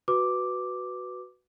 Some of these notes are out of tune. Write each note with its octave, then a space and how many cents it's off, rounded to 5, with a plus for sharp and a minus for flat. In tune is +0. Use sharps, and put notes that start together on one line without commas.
F#4 +0 B4 +0 D6 +0